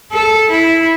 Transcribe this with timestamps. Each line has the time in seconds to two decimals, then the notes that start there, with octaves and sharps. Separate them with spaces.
0.12 A4
0.50 E4